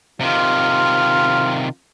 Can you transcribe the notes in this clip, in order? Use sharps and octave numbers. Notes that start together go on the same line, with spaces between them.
C3 D#3 F4